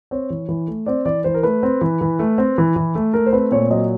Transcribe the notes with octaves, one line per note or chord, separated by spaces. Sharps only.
C4 C#5
E3
E3
A3
C4 D5
E3 D5
E3 C5
A#4
A3 B4
C4
E3
E3
A3
C4
E3
E3
A3
A3 A#4
C5
C4 B4
A#2 C#5
F#3 D#5